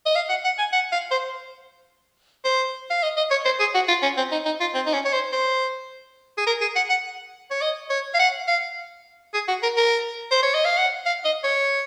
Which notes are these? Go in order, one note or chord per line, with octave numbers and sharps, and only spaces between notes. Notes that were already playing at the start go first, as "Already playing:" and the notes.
D#5
F5
F#5
F#5
G#5
F#5
F5
C5
C5
F5
D#5
D#5
C#5
C5
G#4
F#4
F4
C#4
C4
D#4
D#4
F4
C4
D#4
C#4
C#5
C5
C5
G#4
A#4
G#4
F#5
F#5
C#5
D#5
C#5
F5
F#5
F5
G#4
F#4
A#4
A#4
C5
C#5
D#5
F5
F#5
F5
D#5
C#5